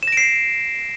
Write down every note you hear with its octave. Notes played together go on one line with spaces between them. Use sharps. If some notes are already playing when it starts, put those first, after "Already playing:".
A#6 C7 D7 E7